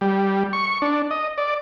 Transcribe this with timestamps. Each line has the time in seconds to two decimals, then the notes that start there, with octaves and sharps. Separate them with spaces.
0.01 G3
0.53 C#6
0.82 D4
1.11 D#5
1.38 D5